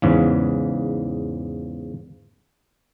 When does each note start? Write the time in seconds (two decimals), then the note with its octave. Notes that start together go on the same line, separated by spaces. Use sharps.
0.02 E2 G#2 C#3